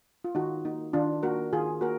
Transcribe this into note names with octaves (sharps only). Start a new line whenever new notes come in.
F4
D#3 D#4 F#4
A#3 D#4
D#3 D4 F4
A#3 F#4 A#4
D#3 F4 G#4
A#3 F#4 A#4